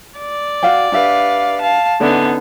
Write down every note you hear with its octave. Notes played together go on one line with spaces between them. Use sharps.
D5
F#4 F5 G5
D4 G4 B4 E5 F5
F5 A5
D3 B3 C#4 D#4 D5 E5